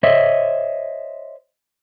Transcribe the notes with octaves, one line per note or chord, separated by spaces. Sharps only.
C5 C#5 D#5 E5